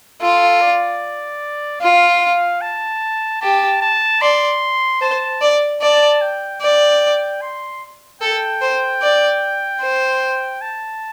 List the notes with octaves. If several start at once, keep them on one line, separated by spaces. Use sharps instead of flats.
F4 A4
D5
F4 F5
F5
A5
G4 A5
A5
D5 C6
C5 A5
D5
D5 A5
G5
D5 G5
C6
A4 G5
C5
D5
C5
A5